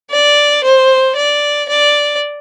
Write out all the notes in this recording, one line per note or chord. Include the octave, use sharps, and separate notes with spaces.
D5
C5
D5
D5